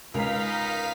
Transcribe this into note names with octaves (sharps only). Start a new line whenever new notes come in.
C#2 D#4 A#4 F5 B6